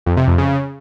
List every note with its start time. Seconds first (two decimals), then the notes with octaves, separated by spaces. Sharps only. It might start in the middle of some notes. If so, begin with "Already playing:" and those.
0.06 F2
0.17 C3
0.27 F2
0.38 C#3